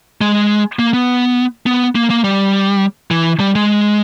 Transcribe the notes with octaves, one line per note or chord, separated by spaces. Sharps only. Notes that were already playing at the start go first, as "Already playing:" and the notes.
G#3
A#3
B3
B3
A#3
A#3
G3
E3
G3
G#3